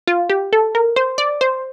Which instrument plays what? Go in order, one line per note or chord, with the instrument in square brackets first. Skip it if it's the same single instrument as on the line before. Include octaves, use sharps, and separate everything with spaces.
[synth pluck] F4
G4
A4
A#4
C5
D5
C5